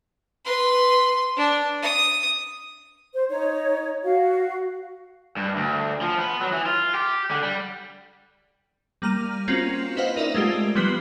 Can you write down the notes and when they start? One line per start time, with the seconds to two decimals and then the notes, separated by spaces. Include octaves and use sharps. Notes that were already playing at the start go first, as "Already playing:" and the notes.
0.45 B4 C6
1.36 D4
1.82 D#6
3.14 C5
3.29 D#4 C#5
4.03 F#4 F5
5.36 G2
5.56 D2
6.01 F3
6.18 B3
6.41 F#3
6.52 E3
6.66 F4
6.94 G4
7.31 D3
7.43 G3
9.02 G3 A#3 A#5 F6 D#7
9.48 A#3 C4 C#4 F4 F#4
9.96 E4 B4 C5 D#5 F5 F#5
10.16 D#4 A#4 D5 E5
10.35 G#3 A3 F4 G4
10.75 F3 G3 B3 B4 C7 G7